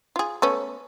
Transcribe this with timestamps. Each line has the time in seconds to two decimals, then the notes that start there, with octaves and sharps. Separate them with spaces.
0.16 F4 G#4
0.42 A3 B3 C#4